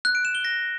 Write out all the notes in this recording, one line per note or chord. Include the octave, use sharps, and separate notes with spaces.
F#6
D7
E7
G7
A#6